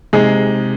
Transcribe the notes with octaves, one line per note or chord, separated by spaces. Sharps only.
C3 G#3 D#4 G#4